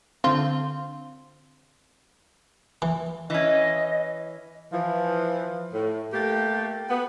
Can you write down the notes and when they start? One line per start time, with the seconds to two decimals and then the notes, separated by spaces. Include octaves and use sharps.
0.24 D3 C4 F4
2.82 E3
3.30 E3 C#4 D#5
4.73 E3 F3
5.74 A2
6.13 A3 A#3 G4
6.90 B3